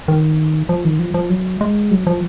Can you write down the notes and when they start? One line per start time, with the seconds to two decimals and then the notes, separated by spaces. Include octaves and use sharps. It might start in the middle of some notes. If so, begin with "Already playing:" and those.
0.08 D#3
0.69 F3
0.85 D#3
0.99 F3
1.14 F3
1.30 F#3
1.61 G#3
1.91 F#3
2.07 F3